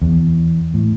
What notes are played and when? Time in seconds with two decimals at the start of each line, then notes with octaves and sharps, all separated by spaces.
0.02 E2
0.74 A2